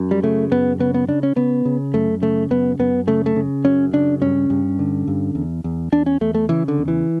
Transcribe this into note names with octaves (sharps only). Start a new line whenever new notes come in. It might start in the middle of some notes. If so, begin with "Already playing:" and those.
Already playing: F#2
G3
C#3 A3
F#2 B3
C#3 B3
B3
C#3 D4
C#4
C#3 B3
C#3
F#2 A3
C#3 A3
F#2 B3
F#2 B3
C#3 A3
A3
C#3
F#2 C#4
C#3 D4
G2 C#4
G2
D3
G2
E2
E2
E2 D4
C#4
E2 A3
A3
C#3 E3
D3
E2
E3